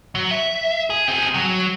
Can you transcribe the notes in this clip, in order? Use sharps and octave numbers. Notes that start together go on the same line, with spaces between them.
F#3
E5
G#4
C4 G#4
F#3